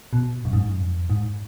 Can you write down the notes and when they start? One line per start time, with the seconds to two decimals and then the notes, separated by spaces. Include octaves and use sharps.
0.13 B2
0.45 F#2
0.53 G#2
0.62 F#2
0.78 F2
1.10 G#2